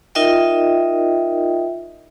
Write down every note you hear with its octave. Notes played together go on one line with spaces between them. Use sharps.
D#4 F4 A#4 D#5 E5 G5